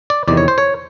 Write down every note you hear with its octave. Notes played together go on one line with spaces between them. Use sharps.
D5
E2 C3 D#3 D5
C#5
C5
C#5